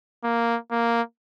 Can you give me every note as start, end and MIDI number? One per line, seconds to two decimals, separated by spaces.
0.24 0.57 58
0.71 1.02 58